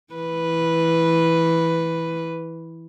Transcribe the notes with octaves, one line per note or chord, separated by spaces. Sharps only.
E3 B4